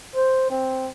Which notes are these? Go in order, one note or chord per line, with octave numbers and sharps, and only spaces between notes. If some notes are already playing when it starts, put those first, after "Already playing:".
C5
C4